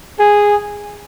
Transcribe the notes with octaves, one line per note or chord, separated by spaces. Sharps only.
G#4